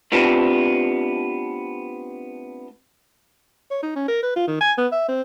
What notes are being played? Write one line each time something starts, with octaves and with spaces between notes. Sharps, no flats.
A3 B3 C4 D4 F4 G4
C#5
D#4
C#4
A#4
B4
F4
D#3
G#5
B3
E5
C4